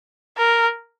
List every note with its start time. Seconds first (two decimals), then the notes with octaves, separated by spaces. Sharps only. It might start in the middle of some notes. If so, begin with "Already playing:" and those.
0.37 A#4